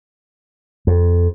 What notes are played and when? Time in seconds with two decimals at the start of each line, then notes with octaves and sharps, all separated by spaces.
0.87 F2